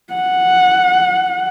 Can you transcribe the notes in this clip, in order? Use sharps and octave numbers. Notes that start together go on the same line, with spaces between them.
F#5